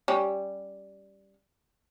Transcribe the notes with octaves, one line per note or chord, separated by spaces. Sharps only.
G3 C#4